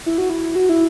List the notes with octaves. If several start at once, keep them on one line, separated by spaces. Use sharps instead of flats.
E4
F#4
E4
F#4
E4